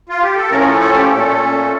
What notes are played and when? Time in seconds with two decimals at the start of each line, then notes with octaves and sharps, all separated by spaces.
0.09 F4
0.22 G4
0.36 A4
0.50 A2 F3 A3 C#4 A#4
0.60 A#4
0.65 A4
0.80 A4
0.94 G4
1.10 A#2 A3 C#4 A4